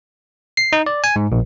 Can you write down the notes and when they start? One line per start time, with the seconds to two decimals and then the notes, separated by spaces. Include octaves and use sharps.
0.57 C7
0.73 D#4
0.86 D5
1.04 G#5
1.16 G#2
1.32 A#1